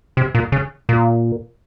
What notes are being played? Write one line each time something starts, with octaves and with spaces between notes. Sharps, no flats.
C3
A#2
C#3
A#2